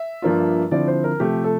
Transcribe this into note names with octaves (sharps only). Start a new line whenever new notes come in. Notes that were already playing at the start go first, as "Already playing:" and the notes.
Already playing: E5
G2 F3 A#3 D4 F4
D3 F3 C4 E4 D5
C5
A#4
C3 F3 A3 G4
A4